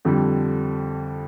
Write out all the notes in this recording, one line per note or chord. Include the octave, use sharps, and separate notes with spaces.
F2 D3 G3